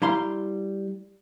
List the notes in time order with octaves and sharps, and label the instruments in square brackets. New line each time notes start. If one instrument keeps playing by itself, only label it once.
[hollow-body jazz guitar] G3 E4 F5 A#5 C6